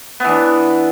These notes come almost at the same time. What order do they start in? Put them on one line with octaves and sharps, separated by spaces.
B3 E3 D4